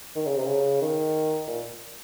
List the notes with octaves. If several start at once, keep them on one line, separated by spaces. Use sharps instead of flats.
D#3
C#3
C3
C#3
D#3
A#2